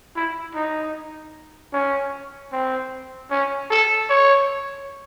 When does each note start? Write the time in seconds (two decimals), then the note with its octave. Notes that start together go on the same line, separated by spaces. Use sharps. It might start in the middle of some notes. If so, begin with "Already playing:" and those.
0.15 E4
0.55 D#4
1.73 C#4
2.52 C4
3.30 C#4
3.70 A4
4.10 C#5